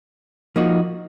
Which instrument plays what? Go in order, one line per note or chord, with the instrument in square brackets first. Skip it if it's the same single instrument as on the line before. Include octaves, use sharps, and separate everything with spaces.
[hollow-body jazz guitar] F3 A#3 D#4 F#4